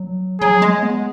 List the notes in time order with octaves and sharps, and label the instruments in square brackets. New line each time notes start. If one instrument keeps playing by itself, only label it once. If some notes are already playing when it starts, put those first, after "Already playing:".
Already playing: [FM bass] F#3
[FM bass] F#3 [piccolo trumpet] G#4
[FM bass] G#3
B3